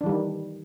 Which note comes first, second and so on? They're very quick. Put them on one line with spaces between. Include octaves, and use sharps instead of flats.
D4 E3 G3 D#3